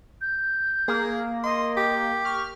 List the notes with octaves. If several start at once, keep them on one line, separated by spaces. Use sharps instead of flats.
G6
A#3 G#4
D#5 C6
G4
C#6 F6